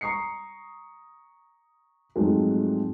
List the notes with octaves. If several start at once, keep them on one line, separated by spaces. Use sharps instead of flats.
A#5 C#6 D#6 C7 C#7
F2 G#2 F#3 G#3 A3